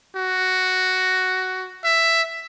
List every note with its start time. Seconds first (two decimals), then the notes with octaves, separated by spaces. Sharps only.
0.16 F#4
1.84 E5